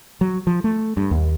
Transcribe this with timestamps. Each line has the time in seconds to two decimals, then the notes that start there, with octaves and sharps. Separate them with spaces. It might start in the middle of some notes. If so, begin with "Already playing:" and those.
0.21 F#3
0.47 F3
0.64 A3
0.97 G2
1.11 D#2